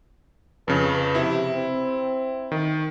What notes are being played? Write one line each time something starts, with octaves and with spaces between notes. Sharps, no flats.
F2 C#3 B4
C3 E4
C4
D#3